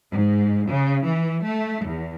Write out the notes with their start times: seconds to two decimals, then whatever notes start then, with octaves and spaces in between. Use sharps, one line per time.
0.11 G#2
0.69 C#3
1.05 E3
1.43 A3
1.86 E2